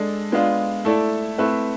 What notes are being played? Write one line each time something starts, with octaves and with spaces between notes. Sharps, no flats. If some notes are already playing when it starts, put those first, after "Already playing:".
Already playing: G#3 D4 A4
G#3 B3 D4 F4
A3 E4 A4 D5
A3 C4 E4 B4 E5